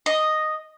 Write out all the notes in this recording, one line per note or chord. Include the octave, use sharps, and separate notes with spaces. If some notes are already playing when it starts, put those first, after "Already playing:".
D#5